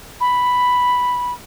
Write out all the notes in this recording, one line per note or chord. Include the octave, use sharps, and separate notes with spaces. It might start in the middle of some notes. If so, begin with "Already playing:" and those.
B5